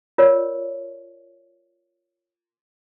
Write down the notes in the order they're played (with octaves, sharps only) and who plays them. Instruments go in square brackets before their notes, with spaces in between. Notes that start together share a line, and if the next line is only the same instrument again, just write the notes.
[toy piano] F4 A#4 C#5 D5